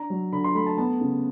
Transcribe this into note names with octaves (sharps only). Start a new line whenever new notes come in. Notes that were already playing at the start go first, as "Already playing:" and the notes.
Already playing: D4 A#5
F#3
D3 B5
C6
A3 B5
A5
B3 A5
C#3